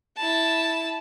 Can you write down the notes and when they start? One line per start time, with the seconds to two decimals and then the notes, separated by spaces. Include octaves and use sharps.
0.17 E4 A5